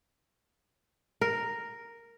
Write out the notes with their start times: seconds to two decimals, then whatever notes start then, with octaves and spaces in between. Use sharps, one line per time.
1.21 A#4